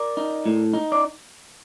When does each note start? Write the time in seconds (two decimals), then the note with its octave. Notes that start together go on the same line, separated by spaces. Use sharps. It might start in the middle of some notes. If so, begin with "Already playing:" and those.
Already playing: A#4 D5
0.17 D#4
0.46 A2
0.73 D#4
0.92 D5